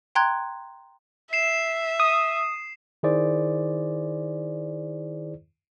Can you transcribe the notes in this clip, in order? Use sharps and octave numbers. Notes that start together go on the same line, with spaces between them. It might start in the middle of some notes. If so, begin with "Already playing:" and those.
G5 A#5 C6 F#6 G#6
E5 C7 E7
D#6
D#3 E4 G#4 C5 D5